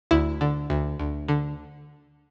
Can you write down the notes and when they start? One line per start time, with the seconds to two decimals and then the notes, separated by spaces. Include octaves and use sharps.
0.11 D2 E4
0.41 D3
0.70 D2
1.00 D2
1.28 D3